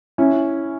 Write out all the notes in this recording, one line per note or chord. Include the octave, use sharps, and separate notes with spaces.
C#4 E4